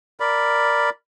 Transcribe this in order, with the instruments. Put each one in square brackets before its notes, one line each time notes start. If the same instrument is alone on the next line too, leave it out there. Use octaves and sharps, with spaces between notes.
[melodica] A#4 D5 B5